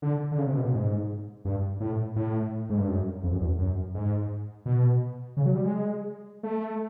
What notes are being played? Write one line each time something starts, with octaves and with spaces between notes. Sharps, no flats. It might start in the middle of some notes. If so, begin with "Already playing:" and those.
D3
D3
C#3
C3
B2
A#2
G#2
G2
A2
A2
G#2
G2
F#2
F2
F#2
E2
F#2
G#2
B2
C#3
F#3
G3
G#3
A3